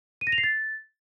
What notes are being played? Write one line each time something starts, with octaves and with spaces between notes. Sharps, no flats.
D#7
A#6
F7
C7
A6